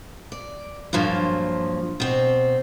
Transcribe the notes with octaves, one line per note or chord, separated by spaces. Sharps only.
D5
G2 A#2 F3 F#3
B2 C4